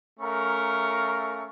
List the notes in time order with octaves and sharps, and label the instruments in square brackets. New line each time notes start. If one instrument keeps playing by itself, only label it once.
[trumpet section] A3 C#4 A#4 F5 A#5 C#6